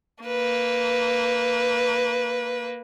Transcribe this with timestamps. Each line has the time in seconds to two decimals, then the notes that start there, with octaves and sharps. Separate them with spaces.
0.24 A#3 B4